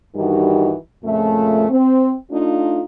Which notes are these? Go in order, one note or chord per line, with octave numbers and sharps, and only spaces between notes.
G2 D#3 E3 G3 D#4 F#4
F2 A#2 C#3 A3
C4
A3 D4 D#4 F4